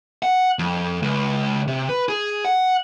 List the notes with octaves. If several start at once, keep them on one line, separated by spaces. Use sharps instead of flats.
F#5
F2
C#2
C3
B4
G#4
F#5